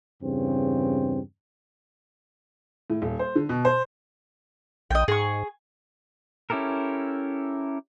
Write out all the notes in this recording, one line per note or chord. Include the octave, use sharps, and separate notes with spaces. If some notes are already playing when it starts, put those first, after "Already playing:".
E2 G2 C#3 C4
A2
D#1
C5
D3
B2
C5
A#1 D#5 G5
G#2 G#4 C#6
C#4 E4 G4 A4 A#4